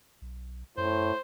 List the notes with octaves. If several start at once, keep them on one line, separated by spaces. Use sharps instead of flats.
B1
F#2 A2 C5